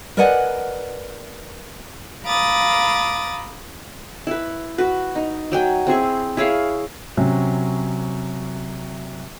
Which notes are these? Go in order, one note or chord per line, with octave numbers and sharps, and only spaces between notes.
A#4 B4 D5 D#5 F#5 G#5
F5 A#5 B5 D6 D#6 A6
E4 B4
F#4 B4
D#4
F#3 G5 G#5
C4 E4 G#4 C#6
E4 G#4 C#5 F5
C3 F#3 C#4